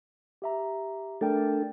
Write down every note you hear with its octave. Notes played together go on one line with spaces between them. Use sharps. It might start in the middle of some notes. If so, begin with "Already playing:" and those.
G4 E5 A#5
A3 D4 A4 A#4 G5